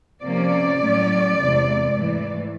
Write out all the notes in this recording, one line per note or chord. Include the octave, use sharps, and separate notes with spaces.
C3 F3 A#3 C#4 D5
A2 F#3 A3 C#4
E2 C3 E3 G#3
G#2 E3 A3